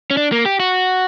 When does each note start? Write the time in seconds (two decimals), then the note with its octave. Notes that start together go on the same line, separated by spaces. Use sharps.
0.11 C#4
0.17 D4
0.32 A#3
0.46 G4
0.60 F#4